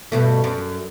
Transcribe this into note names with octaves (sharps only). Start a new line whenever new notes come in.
G2 B2 A3
F#2